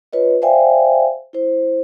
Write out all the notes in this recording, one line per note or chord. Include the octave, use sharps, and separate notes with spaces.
F4 B4 C#5 D#5
C5 D5 E5 F5 G5 G#5
E4 C5